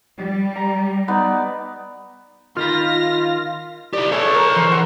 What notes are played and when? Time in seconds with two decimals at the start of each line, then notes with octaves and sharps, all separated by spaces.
0.17 G3
0.56 A#5
1.08 B3 D#4 D5
2.57 D#3 F4 B5 F6 A#6
3.93 E4 G4 D5
4.12 A3 G#4 B4 C#5
4.35 A#4
4.56 E3 C5 C#6
4.72 F#5 C6